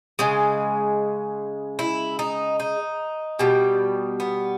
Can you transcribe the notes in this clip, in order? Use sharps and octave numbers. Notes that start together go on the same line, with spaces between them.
C#3 G#3
E4
D#4
D#4
B2 G3
B3